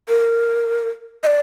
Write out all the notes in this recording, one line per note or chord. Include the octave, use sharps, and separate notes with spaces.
A#4
D#5
D5